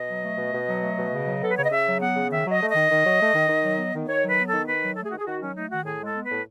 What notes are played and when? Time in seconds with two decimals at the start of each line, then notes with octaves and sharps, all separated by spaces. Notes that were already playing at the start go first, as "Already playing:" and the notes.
Already playing: B2 D#5
0.08 F#3
0.23 A3
0.37 B2
0.53 B2
0.67 F#3
0.82 A3
0.97 B2
1.12 C#3
1.26 F#3
1.41 B3 A4
1.50 B4
1.56 C#3 C#5
1.64 D#5
1.71 C#3 E5
1.86 F#3
2.01 B3 F#5
2.15 C#3
2.30 D#3 E5
2.44 F#3
2.50 D#5
2.60 A3
2.70 D#3 D#5
2.89 D#3
3.04 F#3
3.19 A3
3.33 D#3
3.49 D#3
3.63 F#3
3.78 B3
3.93 D#3
4.07 D#3 C#5
4.22 F#3 B4
4.38 B3
4.48 D#3 A4
4.67 D#3 B4
4.82 F#3
4.96 A3 A4
5.04 G#4
5.11 D#3 F#4
5.18 G#4
5.26 D#3 F#4
5.41 F#3 C#4
5.55 A3 D#4
5.70 D#3 F#4
5.85 A2 G#4
6.00 G#3
6.05 A4
6.14 B3
6.24 B4
6.30 A2